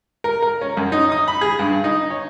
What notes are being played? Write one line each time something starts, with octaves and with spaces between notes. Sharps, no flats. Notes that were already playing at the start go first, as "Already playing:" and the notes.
A#4
A#4
C#4
F#2
D#4
D#6
B5
G#4
G2
D#4
C#5